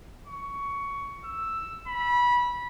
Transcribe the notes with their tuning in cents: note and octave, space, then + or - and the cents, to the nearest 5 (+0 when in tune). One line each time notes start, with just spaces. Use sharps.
C#6 +15
E6 +5
B5 -20